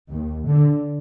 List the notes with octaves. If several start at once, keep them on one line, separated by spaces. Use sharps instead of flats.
D#2
D3